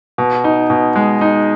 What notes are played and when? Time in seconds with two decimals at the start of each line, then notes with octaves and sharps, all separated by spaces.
0.18 B2
0.44 D#4
0.70 B2
0.96 G#3
1.21 D#4